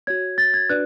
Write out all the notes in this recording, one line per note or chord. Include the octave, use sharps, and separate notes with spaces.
F#4 C#5 G#6
A6
G#6
D4 F#4 B4 D5 F#6